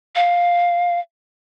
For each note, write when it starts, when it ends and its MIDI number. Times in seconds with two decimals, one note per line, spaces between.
0.15 1.00 77